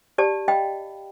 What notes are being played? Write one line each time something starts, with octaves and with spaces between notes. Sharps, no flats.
G4 D5 A5
D#5 F5 G5 B5